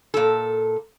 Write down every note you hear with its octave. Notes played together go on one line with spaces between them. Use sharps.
A#2 A4